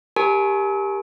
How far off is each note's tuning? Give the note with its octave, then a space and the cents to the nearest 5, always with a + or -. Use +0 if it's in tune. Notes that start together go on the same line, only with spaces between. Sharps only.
G4 +15 A#4 +0 G#5 +35